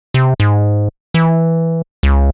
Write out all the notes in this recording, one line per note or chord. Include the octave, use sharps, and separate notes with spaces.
C3
G#2
E3
C#2